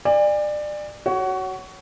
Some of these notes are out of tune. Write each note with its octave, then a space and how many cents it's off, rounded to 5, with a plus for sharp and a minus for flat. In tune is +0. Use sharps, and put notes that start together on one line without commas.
D5 +25 G#5 -40
F#4 +20 C#5 +0